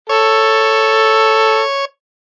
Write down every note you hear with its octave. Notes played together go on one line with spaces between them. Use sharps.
A4 C#5